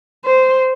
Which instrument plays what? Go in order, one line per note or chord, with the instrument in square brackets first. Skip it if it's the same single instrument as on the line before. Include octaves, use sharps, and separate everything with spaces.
[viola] C5